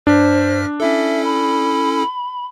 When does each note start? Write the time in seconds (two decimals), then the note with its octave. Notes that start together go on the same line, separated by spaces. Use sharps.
0.07 G2 D4 C5 F6 B6
0.80 C#4 E4 A4 E5
1.24 B5